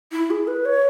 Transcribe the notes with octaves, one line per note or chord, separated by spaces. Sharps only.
E4
G#4
B4
C#5